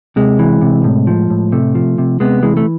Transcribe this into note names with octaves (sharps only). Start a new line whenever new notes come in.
C3 G#3
E3
C3
A2
F3
A2
C3 A3
F3
C3
C3 G#3 B3
E3 G#3
A3